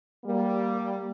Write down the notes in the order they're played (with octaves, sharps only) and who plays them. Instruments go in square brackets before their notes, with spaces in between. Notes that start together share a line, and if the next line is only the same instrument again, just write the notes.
[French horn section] G3 A#3